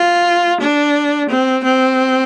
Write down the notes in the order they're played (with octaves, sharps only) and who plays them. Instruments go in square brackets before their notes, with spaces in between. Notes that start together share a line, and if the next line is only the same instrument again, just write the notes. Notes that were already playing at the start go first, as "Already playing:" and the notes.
Already playing: [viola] F4
D4
C4
C4